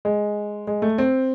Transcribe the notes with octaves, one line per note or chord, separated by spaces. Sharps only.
G#3
G#3
A3
C4